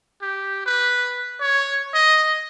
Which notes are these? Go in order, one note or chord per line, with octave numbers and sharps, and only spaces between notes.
G4
B4
C#5
D#5